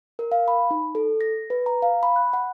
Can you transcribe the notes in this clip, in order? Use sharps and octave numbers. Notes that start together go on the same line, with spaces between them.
A#4
F5
B5
D#4
A4
A#6
B4
A#5
F5
B5
F#6
F#5